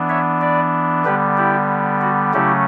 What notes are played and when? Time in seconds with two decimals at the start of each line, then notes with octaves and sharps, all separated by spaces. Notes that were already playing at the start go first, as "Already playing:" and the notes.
Already playing: E3 B3 D4
0.09 C#5 E5
0.41 B4 D5
1.05 D3 G3 B3 G4 B4
1.37 E4 G4
2.02 F#4
2.33 C#3 F#3 A3 C#4 E4 G4